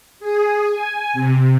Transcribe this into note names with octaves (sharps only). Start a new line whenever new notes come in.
G#4
G#5
C3